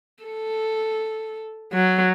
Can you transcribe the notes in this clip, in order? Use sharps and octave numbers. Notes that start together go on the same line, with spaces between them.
A4
F#3